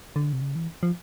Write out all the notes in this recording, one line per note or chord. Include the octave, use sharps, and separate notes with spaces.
D3
C3
C#3
E3
F3